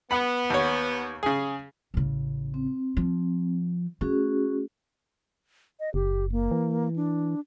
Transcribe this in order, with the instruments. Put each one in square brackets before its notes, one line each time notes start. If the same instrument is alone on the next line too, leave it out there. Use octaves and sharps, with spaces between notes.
[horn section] B3 [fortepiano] F#5 B5
[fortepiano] D#2 C#5
C#3 G#4
[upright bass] A1 C#3
[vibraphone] C4
[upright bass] F3
[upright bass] A3 [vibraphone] C#4 F#4 G#4
[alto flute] D#5
[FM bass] F#1 [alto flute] G4
[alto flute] A#3
[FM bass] E3
[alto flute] D4